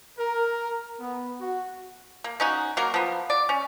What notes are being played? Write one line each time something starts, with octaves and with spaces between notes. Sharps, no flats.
A#4
B3
F#4
A#3
C#4 D#4 F#4
F#3 A#3 A#4
F3 B3
D5
C#4